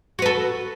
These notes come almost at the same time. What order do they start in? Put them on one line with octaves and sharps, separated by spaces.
F#4 B4 A4